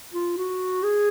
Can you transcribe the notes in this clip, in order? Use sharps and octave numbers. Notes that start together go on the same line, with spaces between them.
F4
F#4
G#4